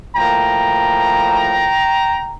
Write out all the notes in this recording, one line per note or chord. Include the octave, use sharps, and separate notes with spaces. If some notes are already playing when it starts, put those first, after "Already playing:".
A2 F3 A#3 G5 A#5